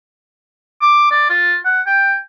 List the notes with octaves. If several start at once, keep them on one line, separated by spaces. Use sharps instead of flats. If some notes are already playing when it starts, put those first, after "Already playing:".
D6
D5
F4
F#5
G5